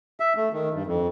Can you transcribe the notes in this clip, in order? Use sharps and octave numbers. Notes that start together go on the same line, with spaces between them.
E5
A3
D#3
G2
F2